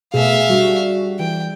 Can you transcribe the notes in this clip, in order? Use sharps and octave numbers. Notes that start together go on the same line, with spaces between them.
B2 A3 G#4 E5 F5
G3 D4 F#4
E3 G5